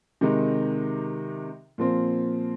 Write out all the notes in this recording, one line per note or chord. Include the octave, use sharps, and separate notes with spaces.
C3 D#3 G#3 D#4
A#2 F3 C4